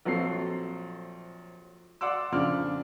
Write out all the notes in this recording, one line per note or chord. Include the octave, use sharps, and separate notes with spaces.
A#1 F#3 C4 A4 C7
D5 F#5 C6 D6 E6
F2 A#2 C#3 D4 D6 F6